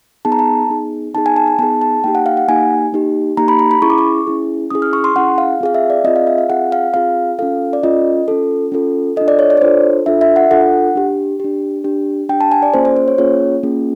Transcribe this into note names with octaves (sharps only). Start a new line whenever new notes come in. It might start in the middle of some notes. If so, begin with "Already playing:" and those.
B3 D#4 G#4 A5
A#5
A5
B3 D#4 G#4
B3 D#4 G#4 A5
G#5
A5
A5
B3 D#4 G#4 A5
A5
A#3 D#4 G4 G5
F#5
F5
F#5
A#3 D#4 G4 G#5
A#3 D#4 G4
A#3 D#4 G4 A#5
B5
A#5
B5
C#4 E4 G#4 C#6
D6
C#6
C#4 E4 G#4
C#4 E4 G#4 D#6
F6
C#6
C6
C#4 E4 G#4 F#5
F5
C4 F4 G#4 F5
E5
D5
C4 F4 G#4 D#5
F5
E5
F5
C4 F4 G#4 F#5
F5
C4 F4 G#4 F5
C#4 F4 A4 F5
D5
C#4 F4 A4 D#5
C#4 F4 A4
C#4 F4 A4
D4 F4 A4 D#5
D5
C#5
D5
C#5
D4 F4 A4 C5
D4 F4 A4 E5
E5
F#5
D4 F4 A4 F#5
D4 G4
D4 G4
D4 G4
D4 G4 G5
A5
G#5
D5
A#3 C#4 F4 G#4 C5
C5
C5
C#5
A#3 C#4 F4 G#4 C#5
A#3 C#4 F4 G#4